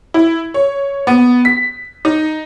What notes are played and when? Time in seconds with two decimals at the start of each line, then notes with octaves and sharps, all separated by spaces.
0.14 E4
0.54 C#5
1.07 B3
1.45 B6
2.05 D#4